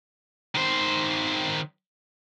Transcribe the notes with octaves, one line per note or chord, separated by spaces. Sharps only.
D#3 C5